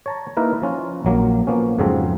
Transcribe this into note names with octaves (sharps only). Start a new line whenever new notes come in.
C#5 A5 A#5
A#3 D#4 E4 A#4 B4
F3 C#4 F4
A#1 F#3 A#3
F3 A#3 B3 C#4
F2 G#2 C#3 F3 F#3 C4